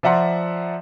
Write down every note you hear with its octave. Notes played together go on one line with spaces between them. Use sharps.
F3 D5 E5 F#5 A#5 C6